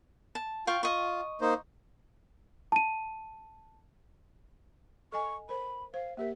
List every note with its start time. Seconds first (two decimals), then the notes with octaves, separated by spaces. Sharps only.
0.35 A5
0.67 F4 F5 G5 C#6
0.83 F4 D#5 C#6
1.41 A#3 D#4 C5
2.72 A5 D#7
5.12 A4 D#5 G#5 C#6
5.49 A#4 C5 B5
5.94 C5 F5
6.17 A#3 G4 A#4 E5